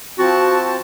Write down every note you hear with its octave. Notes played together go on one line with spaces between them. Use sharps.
F3 C4 F#4 A5